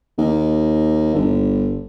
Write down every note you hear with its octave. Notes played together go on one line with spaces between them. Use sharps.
D#2
G1